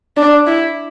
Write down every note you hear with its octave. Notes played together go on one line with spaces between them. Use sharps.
D4
E4